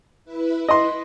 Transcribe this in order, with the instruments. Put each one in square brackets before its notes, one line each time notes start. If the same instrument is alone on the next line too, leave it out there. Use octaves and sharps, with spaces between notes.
[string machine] E4 B4
[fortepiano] D#5 C6